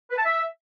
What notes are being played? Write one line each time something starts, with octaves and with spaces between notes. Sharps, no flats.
B4
A5
E5